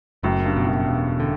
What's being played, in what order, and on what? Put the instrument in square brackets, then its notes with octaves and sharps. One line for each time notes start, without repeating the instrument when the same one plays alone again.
[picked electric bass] F#1 [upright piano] F#2 A2
[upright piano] G2
[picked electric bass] B2
[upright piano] F#2
[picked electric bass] E1 [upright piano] G2
[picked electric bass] D3